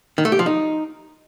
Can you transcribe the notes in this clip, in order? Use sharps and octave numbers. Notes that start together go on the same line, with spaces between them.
D#3
A3
G4
F3
D#4